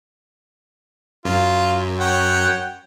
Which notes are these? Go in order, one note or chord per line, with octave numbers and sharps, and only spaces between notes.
F#2 F4
C#5 F#5 G5